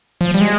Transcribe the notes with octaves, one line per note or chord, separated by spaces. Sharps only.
F3
G3
G#3